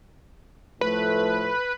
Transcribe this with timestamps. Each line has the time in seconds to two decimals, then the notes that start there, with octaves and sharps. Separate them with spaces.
0.81 A2 F3 A3 B4